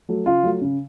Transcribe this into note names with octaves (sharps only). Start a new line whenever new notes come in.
F#3 A3
C#3 F4
F#3 A3
C#3